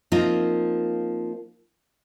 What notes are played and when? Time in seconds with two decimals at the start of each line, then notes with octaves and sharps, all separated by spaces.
0.12 F3 A#3 C4 D#4 F4